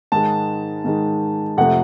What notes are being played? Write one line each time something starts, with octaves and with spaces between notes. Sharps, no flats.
G#2 D#3 G#3 A5
G#2 D#3 G#3
F2 C3 F3 A3 F#5